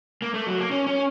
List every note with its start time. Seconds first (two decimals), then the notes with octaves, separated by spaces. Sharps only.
0.22 A#3
0.34 A3
0.47 F#3
0.58 A#3
0.71 C#4
0.87 C#4